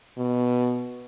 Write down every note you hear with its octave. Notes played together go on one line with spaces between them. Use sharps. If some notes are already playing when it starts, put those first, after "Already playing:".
B2